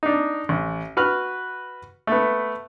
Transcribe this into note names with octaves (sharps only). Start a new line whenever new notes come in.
D4 D#4
A1
F#4 B4 F6 F#6
A3 B3